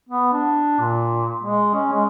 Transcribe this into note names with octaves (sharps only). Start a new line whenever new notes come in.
B3
D4
A#2
G#3
C#4
G#3